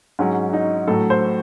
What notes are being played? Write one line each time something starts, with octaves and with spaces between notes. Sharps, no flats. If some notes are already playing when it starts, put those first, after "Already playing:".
G#2 F#3 C#4
D#4
A2 F#3 A4
C5